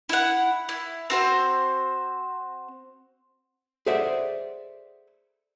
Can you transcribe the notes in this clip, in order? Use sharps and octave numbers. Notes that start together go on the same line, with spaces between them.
E4 F#5
E4
C4 F#4 C5
G#4 A4 C5 D5 E5 F#5